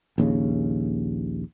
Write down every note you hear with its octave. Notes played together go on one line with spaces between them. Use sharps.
A#1 D#2 C#3